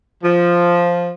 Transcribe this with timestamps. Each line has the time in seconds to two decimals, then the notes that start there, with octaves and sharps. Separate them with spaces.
0.24 F3